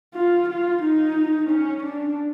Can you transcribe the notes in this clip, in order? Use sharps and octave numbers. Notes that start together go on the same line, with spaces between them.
F4
F4
D#4
C#4
D4